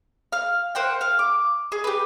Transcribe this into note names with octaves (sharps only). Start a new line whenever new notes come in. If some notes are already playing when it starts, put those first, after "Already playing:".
F5 F6
A#4 C5 F#5 G5
F5
D6
G#4
G4 B4